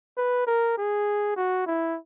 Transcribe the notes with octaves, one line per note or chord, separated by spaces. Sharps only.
B4
A#4
G#4
F#4
E4